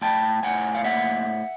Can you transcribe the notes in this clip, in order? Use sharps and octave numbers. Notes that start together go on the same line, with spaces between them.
A2 G5 A5
A2 F#5 G#5
F5
A#3 E5 F#5